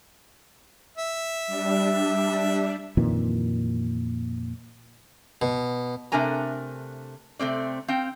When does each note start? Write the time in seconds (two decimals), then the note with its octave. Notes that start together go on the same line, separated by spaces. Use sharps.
0.97 E5
1.47 G3 D4
2.97 F2 A#2 D#3 E3
5.42 B2
6.12 C3 A3 D4 A#4 G#5 A#5
7.39 C3 A3 C4 D5
7.88 C4 F5 G5